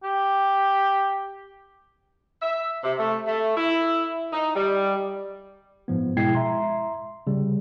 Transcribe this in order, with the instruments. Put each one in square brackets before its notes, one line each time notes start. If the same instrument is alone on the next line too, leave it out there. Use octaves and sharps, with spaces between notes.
[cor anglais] G4
[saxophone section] E5
C3
A3
A3
E4
D#4
G3
[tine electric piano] G#2 F3 B3
B2 G#3 E4 G5 G#6 C7
E5 A#5 C6
C#3 G3